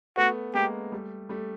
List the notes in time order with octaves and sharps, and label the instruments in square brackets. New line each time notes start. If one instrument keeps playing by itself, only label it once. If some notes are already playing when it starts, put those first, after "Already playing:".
[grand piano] A3 B3 [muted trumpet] F#4
[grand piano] G#3 A#3 [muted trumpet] G4
[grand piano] G3 A3
G3 A3